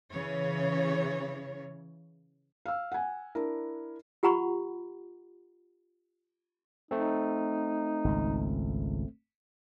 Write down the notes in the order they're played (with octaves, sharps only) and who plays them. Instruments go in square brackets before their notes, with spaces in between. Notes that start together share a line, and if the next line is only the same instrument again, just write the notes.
[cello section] C#3 E3 C#5
[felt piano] F5 E6
F#5 G#5
D4 E4 A#4
[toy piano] F4 G4 F#5 A#5 B5 C#6
[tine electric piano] A3 C4 [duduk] D#4
[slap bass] G#1 C#2